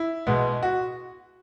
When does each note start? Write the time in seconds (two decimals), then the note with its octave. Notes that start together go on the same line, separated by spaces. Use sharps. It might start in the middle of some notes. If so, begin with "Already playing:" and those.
Already playing: E4
0.27 B2 G#3 B3
0.63 F#4